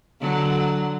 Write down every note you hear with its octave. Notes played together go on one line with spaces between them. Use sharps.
D3 F#3